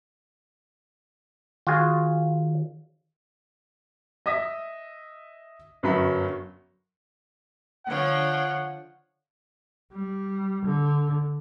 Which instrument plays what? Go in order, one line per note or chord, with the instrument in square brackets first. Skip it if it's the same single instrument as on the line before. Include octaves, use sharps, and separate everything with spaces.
[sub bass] D#3 [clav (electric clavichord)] F4 F#4 G#4
[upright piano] D#5 E5 D#6 A#6 B6
G1 F#2 D3 F#3 B5
[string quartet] D3 F3 C#5 [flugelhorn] F#5
[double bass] G3
D3